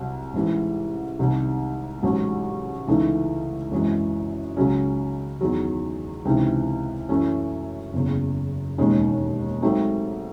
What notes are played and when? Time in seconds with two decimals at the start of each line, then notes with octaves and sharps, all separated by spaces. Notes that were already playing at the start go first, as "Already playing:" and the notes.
Already playing: C2 C3 F#3 C4
0.34 A1 G#2 E3
1.19 C2 C3 D#3
2.03 A1 G#2 F#3
2.88 C#2 C#3 E3 A3 D#4
3.71 G#1 F#2 E3 G#3
4.57 C#2 C#3 F#3 C#4
5.41 E2 D#3 F#3
6.25 C#2 C3 E3 C4 D#4
7.09 F#2 E3 A3 C#4 E4
7.93 F#1 E2 C#3
8.78 E1 D#2 D#3 G#3 C#4
9.62 G#2 F#3 A3 C4 D#4